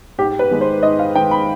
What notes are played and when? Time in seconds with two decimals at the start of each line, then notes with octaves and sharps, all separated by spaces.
0.18 G#2 G4
0.39 B4
0.51 D#3 G#3
0.61 C5
0.83 G#2 D#5
0.99 F5
1.15 D#3 G#3 G5
1.31 B5